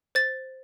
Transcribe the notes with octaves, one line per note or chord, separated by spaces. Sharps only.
C5 A6